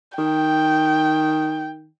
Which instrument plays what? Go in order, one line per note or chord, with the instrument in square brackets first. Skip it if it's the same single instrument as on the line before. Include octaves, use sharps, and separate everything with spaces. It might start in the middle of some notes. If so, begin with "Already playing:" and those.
[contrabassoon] D#3 [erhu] G5